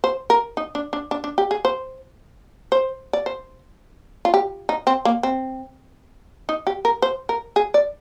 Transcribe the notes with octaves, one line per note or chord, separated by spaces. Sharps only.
C5
A#4
D#4
D4
D4
D4
D4
G4
G#4
C5
C5
D5
C5
F4
G4
D#4
C4
A#3
C4
D#4
G4
A#4
C5
A#4
G#4
D5